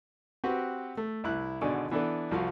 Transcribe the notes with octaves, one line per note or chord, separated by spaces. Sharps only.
C4 F#4 G4 B4 F#5
A3
C2 E4 F#6
G#1 B2 D3 D5 G#5 C#6
E3 B3 D4 E4 A4 D5
C2 F3 F#4 F5